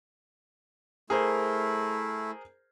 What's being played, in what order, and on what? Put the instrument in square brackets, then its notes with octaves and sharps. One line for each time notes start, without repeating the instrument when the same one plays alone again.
[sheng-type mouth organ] A3 E4 [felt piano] G#4 A#4 C5